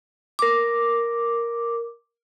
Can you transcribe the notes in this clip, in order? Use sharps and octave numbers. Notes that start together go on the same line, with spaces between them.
A#4 D6